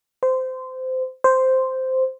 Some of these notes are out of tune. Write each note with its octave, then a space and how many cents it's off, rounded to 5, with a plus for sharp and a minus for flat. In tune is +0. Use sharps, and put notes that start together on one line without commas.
C5 -20
C5 -5